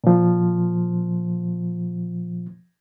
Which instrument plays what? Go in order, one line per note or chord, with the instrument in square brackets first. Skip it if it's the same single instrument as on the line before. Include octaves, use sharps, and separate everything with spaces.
[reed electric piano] A#2 F3